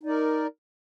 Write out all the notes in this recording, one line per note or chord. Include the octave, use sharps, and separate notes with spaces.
D#4 A#4 D5